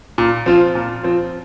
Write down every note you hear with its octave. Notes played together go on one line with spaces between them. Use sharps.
A#2
F3 C4 F4
A#2
F3 C4 F4